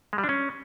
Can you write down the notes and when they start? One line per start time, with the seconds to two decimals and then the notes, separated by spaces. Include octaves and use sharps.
0.13 G#3
0.18 G3
0.24 D4
0.29 C#4